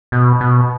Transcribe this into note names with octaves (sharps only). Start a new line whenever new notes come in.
B2
B2